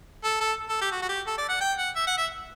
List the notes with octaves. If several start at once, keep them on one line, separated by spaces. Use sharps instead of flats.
A4
A4
A4
G4
F#4
F#4
G4
A4
D5
F#5
G5
F#5
E5
F#5
E5